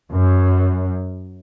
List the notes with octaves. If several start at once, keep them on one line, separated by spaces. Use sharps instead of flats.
F#2